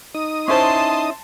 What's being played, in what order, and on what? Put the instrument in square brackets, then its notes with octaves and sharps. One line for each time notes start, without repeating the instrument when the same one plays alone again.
[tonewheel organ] D#4 D#6
[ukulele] C#4 E4 C5 [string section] A5 C6